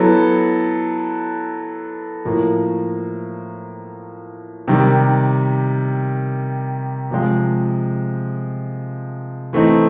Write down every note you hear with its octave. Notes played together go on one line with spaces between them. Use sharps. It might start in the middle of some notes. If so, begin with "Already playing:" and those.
Already playing: F#3 B3 E4 A4
A2 F3 A#3
C3 D#3 G3
C3 F3 G#3
E3 A3 C4 D#4